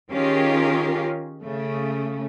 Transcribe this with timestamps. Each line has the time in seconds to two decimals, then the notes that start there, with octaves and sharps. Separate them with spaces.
0.11 D#3 C#4 F4 G4 G#4 A#4
1.41 C#3 A3